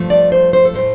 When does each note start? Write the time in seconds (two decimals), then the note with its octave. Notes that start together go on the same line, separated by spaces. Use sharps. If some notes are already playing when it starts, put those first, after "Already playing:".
Already playing: G2 F3 A3
0.10 D5
0.32 C5
0.53 C5
0.65 A4
0.74 A2 A3 C5